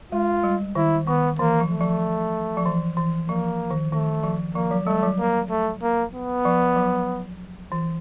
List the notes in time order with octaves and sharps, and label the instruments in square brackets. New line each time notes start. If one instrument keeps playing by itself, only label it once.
[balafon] G#3 [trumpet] F4
[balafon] G3
[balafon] D#3 [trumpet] E4
[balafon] D#3 [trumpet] B3
[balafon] E3 [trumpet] A#3
[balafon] F3
[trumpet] A3
[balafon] F3
F3
E3
E3
[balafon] F3 [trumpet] A#3
[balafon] D#3
[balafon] D#3 [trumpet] A3
[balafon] F3
[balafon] F3 [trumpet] A#3
[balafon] F#3
[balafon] G3 [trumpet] A3
[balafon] F#3
[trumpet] A#3
A3
A#3
B3
[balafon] F3
F#3
E3